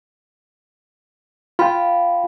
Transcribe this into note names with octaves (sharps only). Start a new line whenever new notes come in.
F4 F5 G5 B5